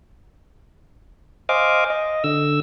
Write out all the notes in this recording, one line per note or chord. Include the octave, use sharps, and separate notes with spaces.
C5 D#5 F5 G#5 D6
D#5
D3 E6